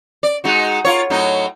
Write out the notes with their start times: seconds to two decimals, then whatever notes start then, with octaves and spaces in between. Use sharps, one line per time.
0.23 D5
0.44 G#3 D#4 F#4
0.85 F4 A#4 C#5
1.10 A2 F#3 D#4